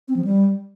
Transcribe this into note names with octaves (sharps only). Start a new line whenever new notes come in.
C4
F3
G3